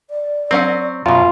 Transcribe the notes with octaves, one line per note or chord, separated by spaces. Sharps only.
D5
F#3 C4 C#4 F#5
F#2 B2 F4